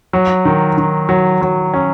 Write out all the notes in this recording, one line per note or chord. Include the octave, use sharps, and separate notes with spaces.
F#3
D#3
D#3
F#3
F#3
C#4